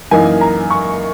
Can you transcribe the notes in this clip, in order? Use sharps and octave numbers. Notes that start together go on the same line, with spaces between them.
F#2 E3 A#3 D#4 G#5
A#5
C#6